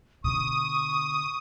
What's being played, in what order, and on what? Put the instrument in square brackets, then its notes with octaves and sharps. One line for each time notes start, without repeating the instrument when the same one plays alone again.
[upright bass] B2 D3 [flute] C#6 [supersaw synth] D#6